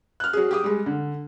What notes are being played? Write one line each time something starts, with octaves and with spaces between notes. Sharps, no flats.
F6 F#6
F#3 G#4
G4 G#4 D6 D#6
G3 G#3
D3